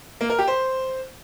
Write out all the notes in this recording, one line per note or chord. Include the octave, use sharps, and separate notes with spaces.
A#3
A#4
G4
C5